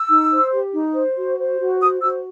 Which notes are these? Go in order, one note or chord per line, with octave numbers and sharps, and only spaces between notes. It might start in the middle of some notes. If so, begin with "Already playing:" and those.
Already playing: E6
D#4
C5
G4
D#4
C5
F#4
C5
F#4
C5 D#6
F#4 E6